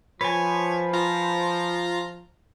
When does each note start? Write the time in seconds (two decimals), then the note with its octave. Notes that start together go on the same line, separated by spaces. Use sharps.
0.21 F3 B4 C#5 G#5
0.93 F4 A#5